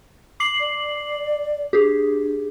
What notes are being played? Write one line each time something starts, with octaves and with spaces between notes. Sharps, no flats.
D6 C7 F#7
D5
D4 G4 G#4